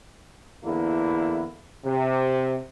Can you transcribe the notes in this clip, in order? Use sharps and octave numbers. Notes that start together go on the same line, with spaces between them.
E2 D3 A#3 E4
C3